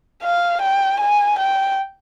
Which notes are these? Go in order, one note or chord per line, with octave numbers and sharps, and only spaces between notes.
F5
G5
G#5
G5